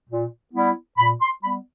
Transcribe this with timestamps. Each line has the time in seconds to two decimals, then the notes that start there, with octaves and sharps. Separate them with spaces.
0.10 A#2
0.54 G3 B3 E4
0.98 A#2 B5
1.21 C6
1.42 G3 B3 B5